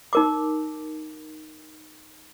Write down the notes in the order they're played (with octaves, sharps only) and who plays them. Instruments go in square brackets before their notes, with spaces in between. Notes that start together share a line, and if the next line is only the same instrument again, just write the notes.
[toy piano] D#4 A#4 D6